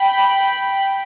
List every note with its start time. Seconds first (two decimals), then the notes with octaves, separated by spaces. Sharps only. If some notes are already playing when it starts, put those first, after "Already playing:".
Already playing: G5 B5